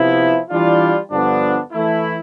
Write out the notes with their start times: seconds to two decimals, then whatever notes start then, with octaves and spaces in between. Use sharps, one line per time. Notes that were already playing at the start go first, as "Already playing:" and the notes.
Already playing: C3 F3 B3 E4
0.51 E3 G3 D4 F4
1.11 G2 D3 F3 B3 D4
1.72 E3 A3 E4